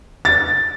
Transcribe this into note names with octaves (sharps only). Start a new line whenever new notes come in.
A6